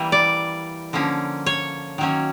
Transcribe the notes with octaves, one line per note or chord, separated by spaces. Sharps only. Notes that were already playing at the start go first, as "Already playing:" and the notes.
Already playing: E3 G3 A#3
D5
D3 F3 A#3 C#4
C#5
D#3 F#3 A#3 C#4